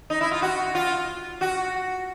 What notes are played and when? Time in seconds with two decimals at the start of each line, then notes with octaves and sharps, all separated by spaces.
0.10 D#4
0.21 E4
0.31 F4
0.42 F#4
0.75 F4
1.41 F#4